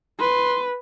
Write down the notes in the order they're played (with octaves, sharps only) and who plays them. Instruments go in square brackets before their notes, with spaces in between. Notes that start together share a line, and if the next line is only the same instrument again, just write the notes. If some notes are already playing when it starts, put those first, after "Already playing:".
[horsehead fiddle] B4 [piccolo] C6